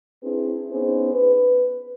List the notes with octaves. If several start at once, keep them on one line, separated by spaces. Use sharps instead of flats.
C4 D4 E4 G#4 B4
B3 C#4 D#4 G#4 C5
B4